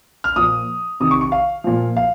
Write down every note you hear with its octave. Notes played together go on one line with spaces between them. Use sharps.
F6
A#2 F3 D#6
C3 D#3 D#6
C#6
C#6
F5
A#2 F3
F5